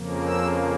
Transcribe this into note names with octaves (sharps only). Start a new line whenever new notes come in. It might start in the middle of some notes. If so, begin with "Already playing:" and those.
Already playing: F2 C#3 F3 A#3
E6